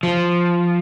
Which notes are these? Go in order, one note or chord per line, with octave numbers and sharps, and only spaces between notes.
F3